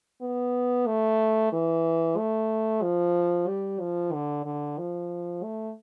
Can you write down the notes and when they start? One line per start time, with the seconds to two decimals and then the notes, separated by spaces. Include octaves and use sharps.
0.21 B3
0.86 A3
1.53 E3
2.17 A3
2.82 F3
3.48 G3
3.80 F3
4.13 D3
4.45 D3
4.78 F3
5.43 A3